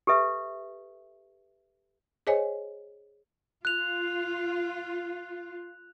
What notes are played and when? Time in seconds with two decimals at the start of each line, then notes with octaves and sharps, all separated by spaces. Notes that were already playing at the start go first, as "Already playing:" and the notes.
0.07 G4 A4 B4 E5
2.27 G#4 C5 C#5 D#5 G#5
3.65 F4 F#6 F7